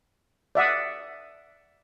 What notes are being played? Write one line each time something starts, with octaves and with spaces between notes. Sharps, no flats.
D5 E5 F#5 D#6